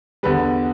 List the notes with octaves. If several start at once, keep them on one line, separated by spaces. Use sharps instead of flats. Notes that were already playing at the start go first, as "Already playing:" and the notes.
E2 D3 G3 B4